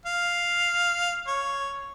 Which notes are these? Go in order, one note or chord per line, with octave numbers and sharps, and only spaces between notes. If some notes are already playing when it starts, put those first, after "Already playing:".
F5
C#5